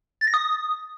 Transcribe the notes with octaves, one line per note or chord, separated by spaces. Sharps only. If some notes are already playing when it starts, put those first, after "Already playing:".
A6
A#6
D#6